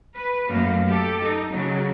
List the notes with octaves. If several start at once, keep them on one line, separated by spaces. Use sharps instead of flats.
B4
F#2 A3 A#3
G4 A4
D#4
C#3 F#3